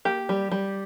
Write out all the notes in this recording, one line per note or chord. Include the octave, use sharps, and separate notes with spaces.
A#3 G4
G3
G3